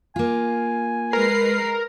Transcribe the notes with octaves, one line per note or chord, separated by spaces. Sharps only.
A#3 F4 G#5
G#3 A#4 B4 C7